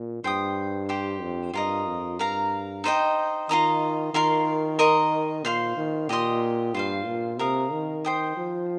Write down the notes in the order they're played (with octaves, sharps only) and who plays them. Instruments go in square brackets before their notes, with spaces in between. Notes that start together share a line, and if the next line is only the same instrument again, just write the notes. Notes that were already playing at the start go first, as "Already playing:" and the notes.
Already playing: [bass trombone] A#2
[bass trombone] G2 [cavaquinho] C5 G5 D#6
[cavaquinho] G4 C5 G5
[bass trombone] F2
[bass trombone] G2 [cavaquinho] F4 A#4 D#5
[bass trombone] F2
[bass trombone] G2 [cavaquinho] A#4 F5 A#5
[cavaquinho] D#4 C5 D#5 G5
[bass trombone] D#3 [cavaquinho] F4 D#5 A#5 D#6
[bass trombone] D#3 [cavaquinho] F4 A#4 F5 C6
[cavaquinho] A#4 D#5 C6 D#6
[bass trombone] A#2 [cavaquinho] C5 F5 C6
[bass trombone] D#3
[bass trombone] A#2 [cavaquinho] G4 D#5 C6 D#6
[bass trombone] G2 [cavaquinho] F4 C5 F5
[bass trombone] A#2
[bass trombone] C3 [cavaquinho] A#4 F5 D#6
[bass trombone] D#3
[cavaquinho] C5 G5 D#6
[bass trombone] F3